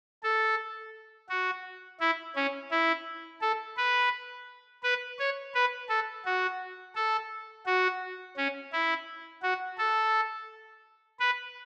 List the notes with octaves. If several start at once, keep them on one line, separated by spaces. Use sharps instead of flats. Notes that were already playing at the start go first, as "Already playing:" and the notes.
A4
F#4
E4
C#4
E4
A4
B4
B4
C#5
B4
A4
F#4
A4
F#4
C#4
E4
F#4
A4
B4